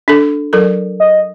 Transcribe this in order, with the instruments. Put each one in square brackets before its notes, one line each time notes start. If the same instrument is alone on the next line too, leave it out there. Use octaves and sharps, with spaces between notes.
[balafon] D4 A4
F#3 A4 A#4
[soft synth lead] D#5